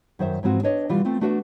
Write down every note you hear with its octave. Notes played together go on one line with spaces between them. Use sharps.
F#2 D#3 C5 E5
G#2 E3 F3 C4 F#4
D4 B4 C#5 D#5
B2 E3 G3 F4
A3 C4 F4
A3 D4 F#4 B4 D#5 E5